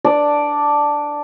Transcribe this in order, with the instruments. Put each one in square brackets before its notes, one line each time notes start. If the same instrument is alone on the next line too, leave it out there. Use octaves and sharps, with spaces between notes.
[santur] D4 D5